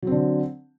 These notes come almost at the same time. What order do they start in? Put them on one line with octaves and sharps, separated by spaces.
F#3 C4 D3